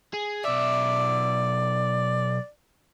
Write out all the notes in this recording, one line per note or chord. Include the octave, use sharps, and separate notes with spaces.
G#4
B1 D5 E5